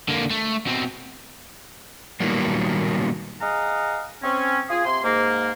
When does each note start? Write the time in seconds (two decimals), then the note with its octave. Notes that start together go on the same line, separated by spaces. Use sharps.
0.08 D3 A#3
0.30 A3
0.66 B2 C4
2.20 A#2 D#3 F#3 G3 A#3 B3
3.41 G#4 D#5 F5 F#5 A#5
4.22 C4 C#4
4.69 F4 G#4
4.85 C3 C6
5.03 G#2 A#3